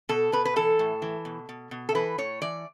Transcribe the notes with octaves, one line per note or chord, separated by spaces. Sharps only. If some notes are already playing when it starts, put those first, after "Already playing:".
B2 A4
B2 B4
B4
E3 A4
A2
E3
B2
B2
B2
A4
E3 B4
A2 C#5
E3 D5